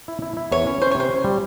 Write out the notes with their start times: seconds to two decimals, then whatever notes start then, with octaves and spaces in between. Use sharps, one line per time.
0.08 E4
0.22 E4
0.37 E4
0.52 E2 C#5
0.67 C#4
0.82 C#4 C5
0.91 C#5
0.95 C3 C5
1.10 C#4
1.24 G3